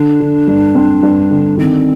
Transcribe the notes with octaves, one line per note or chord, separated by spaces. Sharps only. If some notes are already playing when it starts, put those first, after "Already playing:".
Already playing: D3 D4
D3
G2
C4
G2
D3
D#3 C4